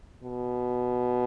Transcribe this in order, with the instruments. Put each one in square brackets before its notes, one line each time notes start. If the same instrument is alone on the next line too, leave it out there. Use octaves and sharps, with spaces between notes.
[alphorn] B2